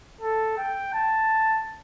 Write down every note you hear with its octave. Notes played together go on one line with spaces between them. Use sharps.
A4
G5
A5